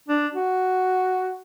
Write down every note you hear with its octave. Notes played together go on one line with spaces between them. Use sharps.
D4
F#4